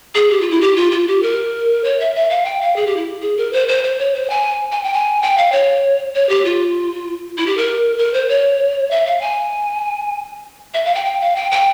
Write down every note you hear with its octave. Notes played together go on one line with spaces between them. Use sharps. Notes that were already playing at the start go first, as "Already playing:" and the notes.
G#4
G4
F4
E4
G4
F4
F4
G4
A#4
C#5
E5
E5
F5
G5
F5
G#4
G4
E4
G#4
A#4
C5
C5
C5
C#5
C5
G#5
G#5
G5
G#5
G5
F5
C#5
C#5
G4
F4
E4
G4
A#4
A#4
C5
C#5
E5
F5
G#5
E5
F5
G5
G5
F5
G5
G5